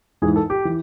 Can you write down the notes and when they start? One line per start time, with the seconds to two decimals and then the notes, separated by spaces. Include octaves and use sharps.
0.22 G#2 E3 G#4
0.36 A4
0.50 G4
0.65 E3